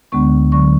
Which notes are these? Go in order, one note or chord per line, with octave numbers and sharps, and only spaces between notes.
D2 D3 G#3 B3 C#6
D3 F#3 C#6